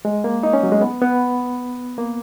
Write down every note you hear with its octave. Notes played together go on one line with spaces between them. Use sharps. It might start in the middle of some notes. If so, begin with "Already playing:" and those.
G#3
A#3
D#4
C#4
F#3
G#3
B3
B3
A#3